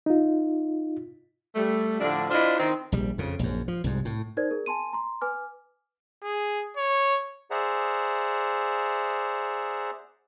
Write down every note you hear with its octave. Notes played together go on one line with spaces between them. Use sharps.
D#4 F4
G3 A3
A2 D3 F3 D4
D4 E4 F4 C5 D5 D#5
D#3 C4 D#4
A#1 G3
F2 C#3
A#1 F#2
F3
C2 G#2
A2
D#4 A#4 C5 D5 G#6
G#4 A#4
G#5 A5 C6 D#7
A#5 C6
B4 G#5 D6 F6
G#4
C#5
G#4 C5 D5 E5 F#5 A#5